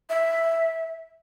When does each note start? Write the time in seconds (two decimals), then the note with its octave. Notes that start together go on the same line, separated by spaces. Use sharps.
0.10 E5